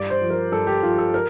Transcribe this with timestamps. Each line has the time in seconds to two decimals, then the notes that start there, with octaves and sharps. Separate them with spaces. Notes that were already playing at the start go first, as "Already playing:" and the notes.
Already playing: G2 D5
0.10 C5
0.21 F3
0.30 A#4
0.51 G2 A4
0.67 G4
0.83 F3 F4
0.98 A4
1.14 A#4